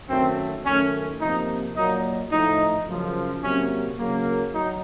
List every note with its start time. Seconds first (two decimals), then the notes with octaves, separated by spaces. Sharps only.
0.09 F#2 D#3 F#3 A3 C4
0.65 F#2 D#3 A3 C#4
1.21 C3 F3 A#3 D#4
1.76 A#2 F#3 A#3 D#4
2.31 A2 F3 A3 D#4
2.87 F#2 C#3 F3
3.43 C3 F#3 A#3 C#4
3.98 C#3 F#3 A#3
4.54 F#3 D#4